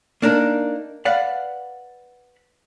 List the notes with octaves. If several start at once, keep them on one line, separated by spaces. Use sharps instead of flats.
A#3 D4 D#4 A#4
B4 D5 F5 F#5